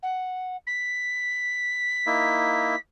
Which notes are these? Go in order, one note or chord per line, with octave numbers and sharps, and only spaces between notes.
F#5
B6
A#3 D#4 E4